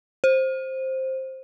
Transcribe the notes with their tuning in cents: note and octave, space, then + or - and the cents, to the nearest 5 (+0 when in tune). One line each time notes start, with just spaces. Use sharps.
C5 +10